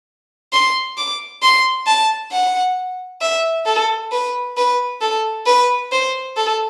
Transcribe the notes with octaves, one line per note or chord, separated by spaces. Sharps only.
C6
D6
C6
A5
F#5
E5
A4
B4
B4
A4
B4
C5
A4